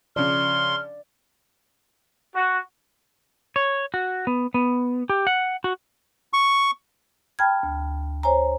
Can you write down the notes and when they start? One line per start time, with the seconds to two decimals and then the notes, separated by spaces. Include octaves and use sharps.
0.16 C#3 F3 D5 C6 F6
2.35 F#4
3.56 C#5
3.94 F#4
4.27 B3
4.54 B3
5.09 G4
5.27 F#5
5.64 F#4
6.33 C#6
7.39 G5 A5 B5 F6 G#6
7.63 D2
8.23 C5 C#5 G#5 A#5